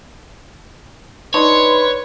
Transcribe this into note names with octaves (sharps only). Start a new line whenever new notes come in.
D4 D#4 B4 C#5 C6